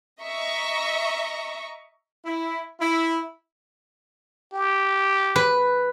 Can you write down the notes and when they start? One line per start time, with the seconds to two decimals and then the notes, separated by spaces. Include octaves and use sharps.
0.22 D#5 E5 A#5 C#6
2.24 E4
2.79 E4
4.54 G4
5.36 B4